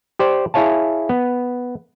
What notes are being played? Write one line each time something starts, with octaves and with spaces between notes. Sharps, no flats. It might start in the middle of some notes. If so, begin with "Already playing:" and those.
G4 C5 D5
E4 G#4 C#5 F5 A5
B3